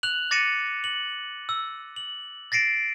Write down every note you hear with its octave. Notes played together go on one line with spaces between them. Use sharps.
F#6 F7 F#7
D6 A6 A#6 C#7 D#7 E7
F#7
E6
F#7
A6 A#6 C7 D7 E7